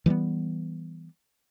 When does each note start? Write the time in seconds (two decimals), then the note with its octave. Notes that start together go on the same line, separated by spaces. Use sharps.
0.06 E3 G3 A#3 B3